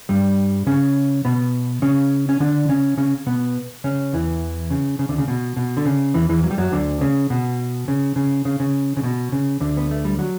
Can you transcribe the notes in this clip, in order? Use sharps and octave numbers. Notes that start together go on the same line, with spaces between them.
G2 G3
C#3 C#4
B2 B3
C#3 C#4
C#4
D3 D4
C#3 C#4
C#3 C#4
B2 B3
C#3 C#4
E2 E3
C#3
C#3
D2 D3
C#3
B2
B2
D3
C#3
E2 E3
E2 E3
F#3
G3
F#2 F#3
D2 D3
C#3
B2
C#3
C#3
C#3
C#3
C#3
B2
C#3
D2 D3
B3
A3
G3
F#3